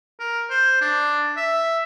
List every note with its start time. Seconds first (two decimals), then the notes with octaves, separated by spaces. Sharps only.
0.20 A#4
0.50 C5
0.81 D4
1.37 E5